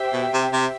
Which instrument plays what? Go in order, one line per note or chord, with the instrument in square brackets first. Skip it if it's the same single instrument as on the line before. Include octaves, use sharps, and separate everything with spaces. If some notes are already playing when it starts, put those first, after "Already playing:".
Already playing: [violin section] G4 C5 E5 G5
[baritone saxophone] B2
C3
C3